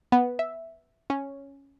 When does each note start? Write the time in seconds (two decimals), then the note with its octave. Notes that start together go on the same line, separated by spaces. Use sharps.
0.12 B3
0.39 E5
1.10 C#4